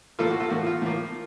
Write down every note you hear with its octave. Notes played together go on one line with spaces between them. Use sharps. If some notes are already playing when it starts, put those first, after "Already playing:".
A2 F3 A#3 F4 A4
F#4
F4 A4
A2 F3 A#3 F#4
F4
A2 F3 A#3